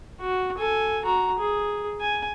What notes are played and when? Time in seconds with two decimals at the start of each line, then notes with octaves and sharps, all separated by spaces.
0.21 F#4
0.58 A4 G#5
1.05 F#4 A#5
1.39 G#4
2.01 G#5